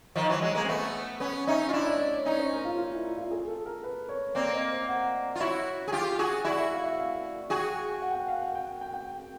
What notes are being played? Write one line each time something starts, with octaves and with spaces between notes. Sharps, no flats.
D#3 F3 D#5
E3 F#3
F#3 G#3
G#3 A#3
C4
A3 B3
B3 C#4
C#4 D#4 E5
F4
D4 E4 D5
D#5
D5
C#5
C#4 D#4 D5
C5
A#4
F4
F4
E4
F4
G#4
A4
A#4
B4
C#5
A#3 C4 D5
D#5
F#5
F4
E4 F#4 C#5
G#4
F4 G4
F#4 G#4
E4 F#4 D5
E5
F5
E5
F5
F#4 G#4 G5
F#5
G5
F#5
F5
F#5
G5
G5
G5